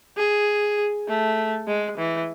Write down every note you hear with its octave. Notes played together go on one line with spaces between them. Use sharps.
G#4
A3
G#3
E3